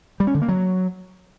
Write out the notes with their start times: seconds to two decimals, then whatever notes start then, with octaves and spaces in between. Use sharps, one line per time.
0.20 G3
0.27 C#4
0.34 D3
0.41 A#3
0.49 F#3